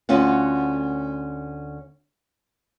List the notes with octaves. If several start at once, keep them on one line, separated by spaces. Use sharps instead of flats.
D2 C#4 F4 F#5